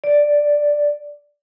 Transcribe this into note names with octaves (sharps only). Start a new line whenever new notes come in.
D5